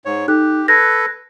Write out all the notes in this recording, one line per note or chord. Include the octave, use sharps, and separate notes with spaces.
G#2 C#5
D#4 G4 A4 F#6
A4 B4 F#6 G#6 A#6